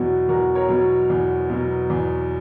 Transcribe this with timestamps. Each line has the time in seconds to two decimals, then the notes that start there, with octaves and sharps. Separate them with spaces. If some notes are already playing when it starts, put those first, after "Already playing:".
Already playing: E2 B2 F#3 F#4
0.29 E2 F#4 A#4
0.55 A#4 C#5
0.69 B2 F#3
1.10 E2
1.50 B2 F#3
1.90 E2